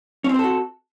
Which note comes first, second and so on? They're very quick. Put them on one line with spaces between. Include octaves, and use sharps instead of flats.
C#4 C4 C5 A4 F#4